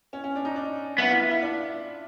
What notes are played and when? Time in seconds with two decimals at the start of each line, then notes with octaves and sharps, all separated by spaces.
0.13 C#4
0.24 C#4
0.36 D4
0.45 D#4
0.56 D4
0.98 B3 E4
1.10 F4
1.20 E4
1.31 E4
1.42 D4